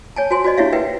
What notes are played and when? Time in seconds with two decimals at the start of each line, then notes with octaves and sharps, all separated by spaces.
0.16 C#5 G#5 A5
0.31 F#4 C5 G#5 C6
0.44 F#4 C5 D5 D#5
0.57 D4 E4 G4 C#5 E5 F5
0.73 A#4 B4 E5 F#5 G5